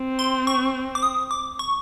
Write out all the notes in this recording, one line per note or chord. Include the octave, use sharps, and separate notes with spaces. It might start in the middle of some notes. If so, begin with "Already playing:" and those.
Already playing: C4
C6
C#6
D6
D#6
D6
C#6